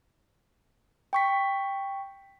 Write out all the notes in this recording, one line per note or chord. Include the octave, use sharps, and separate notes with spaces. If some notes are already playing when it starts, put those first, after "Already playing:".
G5 C#6 B6